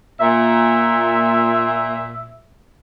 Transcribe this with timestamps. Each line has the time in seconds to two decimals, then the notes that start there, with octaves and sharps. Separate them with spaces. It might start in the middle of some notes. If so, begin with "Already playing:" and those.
0.20 A#2 E5